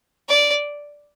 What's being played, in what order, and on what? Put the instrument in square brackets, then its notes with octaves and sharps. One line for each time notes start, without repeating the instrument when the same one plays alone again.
[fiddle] D5